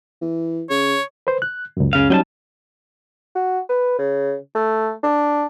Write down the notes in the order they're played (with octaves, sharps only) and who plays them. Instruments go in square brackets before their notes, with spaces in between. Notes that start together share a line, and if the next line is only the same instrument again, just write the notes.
[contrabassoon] E3
[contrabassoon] C#3 [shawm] C#5
[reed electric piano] B4 C5
F#6
C#2 F#2
[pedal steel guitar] C#3 F5
[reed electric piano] F#3 G3 D#4 [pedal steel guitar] C#4 G5 A5
[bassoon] F#4
B4
C#3
A3
D4